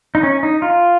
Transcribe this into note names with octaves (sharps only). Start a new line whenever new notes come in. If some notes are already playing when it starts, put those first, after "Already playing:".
D#4
C#4
D#4
F4